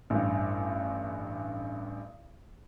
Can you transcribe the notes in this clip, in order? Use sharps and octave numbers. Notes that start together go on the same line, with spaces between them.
A1 G2